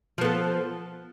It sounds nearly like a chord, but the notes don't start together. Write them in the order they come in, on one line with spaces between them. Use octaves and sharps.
F3 B3 A4